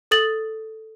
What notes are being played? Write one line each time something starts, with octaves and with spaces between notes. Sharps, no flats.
A4 D#6 A6 F#7